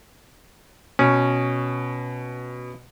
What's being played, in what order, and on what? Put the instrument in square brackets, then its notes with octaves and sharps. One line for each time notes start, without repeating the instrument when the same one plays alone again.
[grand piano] B2 [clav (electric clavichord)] C#4